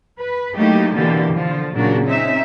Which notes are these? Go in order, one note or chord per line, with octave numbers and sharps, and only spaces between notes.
B4
F#3 A3 A#3 D#4 E4 G4
B2 D3 E3 A#3 D4 G4
D3 F3 F4
A#2 C#3 F#3 A#3 D4 F#4
C4 C#4 D#4 E5